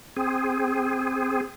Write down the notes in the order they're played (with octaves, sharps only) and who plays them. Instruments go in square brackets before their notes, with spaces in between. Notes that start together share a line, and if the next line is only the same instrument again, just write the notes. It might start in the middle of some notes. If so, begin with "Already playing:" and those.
[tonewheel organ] C4 G#4